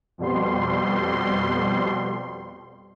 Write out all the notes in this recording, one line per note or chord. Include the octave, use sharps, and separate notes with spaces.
F2 B2 G3 C6